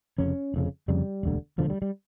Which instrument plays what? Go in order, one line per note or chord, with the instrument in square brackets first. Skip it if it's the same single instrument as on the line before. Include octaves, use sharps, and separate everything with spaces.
[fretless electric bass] F1 F2 C#3 C#4
F1 F2 C#3
F1 F2 C#3 G3
E1 D2 D3
E1 D2 D3 F3
G3
G3